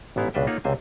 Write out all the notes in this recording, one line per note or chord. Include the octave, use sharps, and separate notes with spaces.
A1 G#2 B3 E4 F5
C#2 B2 D4 B4 E5 G5
A#3 D#4 F4 A4 C#5 F#5
C#2 C3 C5 G#5